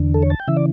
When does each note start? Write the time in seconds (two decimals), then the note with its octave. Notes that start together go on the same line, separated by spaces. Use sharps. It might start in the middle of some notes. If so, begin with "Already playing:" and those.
Already playing: E2 D3
0.14 A4
0.23 C#5
0.30 A5
0.40 G5
0.48 C#3 E3 E5
0.57 D5